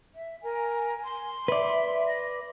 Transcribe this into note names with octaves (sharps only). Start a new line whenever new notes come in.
E5
A#4 G#5
C6
B4 D5 E5
A#6